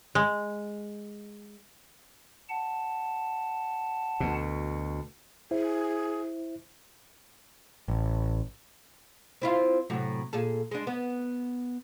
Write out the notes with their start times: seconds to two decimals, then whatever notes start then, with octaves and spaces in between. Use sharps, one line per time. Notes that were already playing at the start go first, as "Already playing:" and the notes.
0.15 G#3
2.49 F#5 A5
4.20 D2 B2
5.51 E4 G#4 C5 E5
7.88 A1
9.42 C4 E4 F4
9.90 A2 C3 F#3
10.33 A#2 G#4 A4
10.71 G#3 D4
10.87 B3